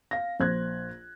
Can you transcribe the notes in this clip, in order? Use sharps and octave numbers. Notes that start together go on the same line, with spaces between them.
F5 A#6
A#1 C5 F#6 G#6